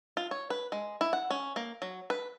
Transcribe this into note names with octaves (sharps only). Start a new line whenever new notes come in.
F4
C#5
B4
G#3
E4
F#5
C#4
A#3
F#3
B4